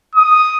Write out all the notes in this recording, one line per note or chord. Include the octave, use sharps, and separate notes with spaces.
D#6